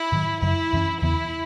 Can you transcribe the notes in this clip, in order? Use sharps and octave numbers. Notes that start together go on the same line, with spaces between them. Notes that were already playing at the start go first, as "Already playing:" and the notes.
Already playing: E4
G#2 D#3 F#3
F#2 C#3 F#3 E4
F#2 E3 G#3 C#4
E2 C#3 E3 B3 E4